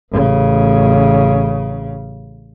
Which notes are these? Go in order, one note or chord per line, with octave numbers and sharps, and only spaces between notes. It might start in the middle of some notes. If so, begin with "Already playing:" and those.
A1 C#3